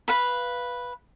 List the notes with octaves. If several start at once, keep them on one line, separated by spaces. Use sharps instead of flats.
B4 F5 B5